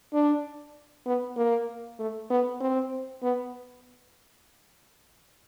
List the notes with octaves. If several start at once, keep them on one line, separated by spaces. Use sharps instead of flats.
D4
B3
A#3
A3
B3
C4
B3